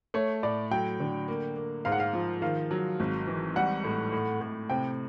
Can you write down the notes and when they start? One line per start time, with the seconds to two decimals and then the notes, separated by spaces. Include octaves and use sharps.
0.14 A3 C#5
0.43 A2 D5
0.71 F#3 G5
1.00 D3
1.28 A#3
1.56 A#3
1.85 G#2 F5
1.92 F#5
2.00 F5
2.13 F3
2.42 D#3 F5
2.71 F#3
3.00 G#1
3.27 E3
3.56 G3 F#5
3.84 A2
4.12 A2
4.41 A2
4.70 C3 G5